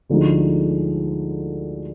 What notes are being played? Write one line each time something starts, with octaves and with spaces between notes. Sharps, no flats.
D2 D3 F3 G#3 D#4